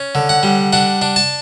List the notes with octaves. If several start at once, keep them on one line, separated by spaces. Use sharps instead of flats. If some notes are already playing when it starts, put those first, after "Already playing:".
Already playing: C#4
D3
F#5
G3
D4 F#5
D4
A5